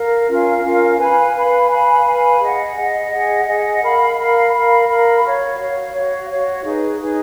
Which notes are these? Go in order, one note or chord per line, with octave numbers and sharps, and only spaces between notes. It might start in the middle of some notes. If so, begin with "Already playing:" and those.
Already playing: A#4 F5
C#4 F4 A#4 F5
C#4 F4 A#4 F5
B4 F5 G#5 B5
B4 F5 G#5 B5
B4 F5 G#5 B5
B4 F5 G#5 B5
G#4 D#5 F#5
G#4 D#5 F#5
G#4 D#5 F#5
G#4 D#5 F#5
A#4 F5 B5
A#4 F5 B5
A#4 F5 B5
A#4 F5 B5
F#4 C#5 F5
F#4 C#5 F5
F#4 C#5 F5
F#4 C#5 F5
D#4 G#4 B4
D#4 G#4 B4